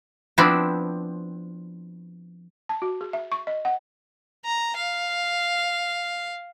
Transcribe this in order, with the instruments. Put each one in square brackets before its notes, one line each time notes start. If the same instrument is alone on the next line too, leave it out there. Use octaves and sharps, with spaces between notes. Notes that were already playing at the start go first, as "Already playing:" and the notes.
[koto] F3 B3 C4 D4 E4 D5
[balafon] A5
F#4
G#4
E5
C#6
D#5
F#5
[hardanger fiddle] A#5
F5